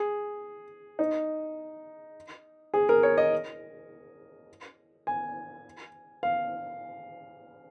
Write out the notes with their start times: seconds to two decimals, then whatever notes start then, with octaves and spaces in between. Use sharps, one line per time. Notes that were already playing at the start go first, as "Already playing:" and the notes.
Already playing: G#4
0.99 D#4
2.74 G#4
2.89 A#4
3.03 C#5
3.18 D#5
5.07 G#5
6.23 F5